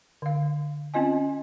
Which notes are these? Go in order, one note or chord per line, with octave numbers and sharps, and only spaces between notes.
D3 F5
C4 C#4 F4 D#5 G#5